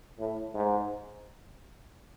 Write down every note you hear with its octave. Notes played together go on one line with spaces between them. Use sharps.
A2
G#2